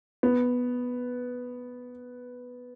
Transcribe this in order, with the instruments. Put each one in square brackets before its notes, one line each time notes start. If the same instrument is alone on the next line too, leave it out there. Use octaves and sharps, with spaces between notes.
[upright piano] B3